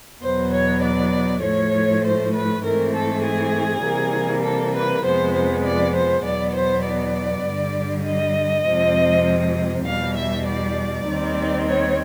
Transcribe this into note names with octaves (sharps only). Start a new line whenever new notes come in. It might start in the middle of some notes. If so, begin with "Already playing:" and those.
E2 B2 F#3 B3 C5
C#5
D5
A2 F3 A3 C#5
C5
B4
G#2 E3 A3 C4 A#4
A4
G#4
C3 E3 G3 A#3
A4
B4
F2 C3 F3 G#3 B3 C5
C5
D5
C5
E2 B2 F#3 B3 D5
C5
D5
G2 D3 G3
D#5
F2 C3 F3 G#3 C4
E2 B2 G3 F5
E5
D5
D#2 D#3 G3 C4
C#5